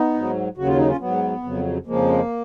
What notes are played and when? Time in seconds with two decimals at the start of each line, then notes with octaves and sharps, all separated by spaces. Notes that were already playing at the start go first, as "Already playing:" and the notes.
Already playing: B3 D#4
0.14 G#2 F#3
0.57 D#2 C#3 F#3 F#4
0.67 F4
0.78 D#4
0.87 C#4 F4
1.00 G#2 F#3 B3
1.43 F2 C#3 F#3
1.86 F2 C#3 F3 G#3 A#3